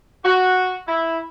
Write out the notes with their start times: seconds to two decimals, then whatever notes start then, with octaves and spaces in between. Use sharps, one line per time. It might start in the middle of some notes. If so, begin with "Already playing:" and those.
0.24 F#4
0.88 E4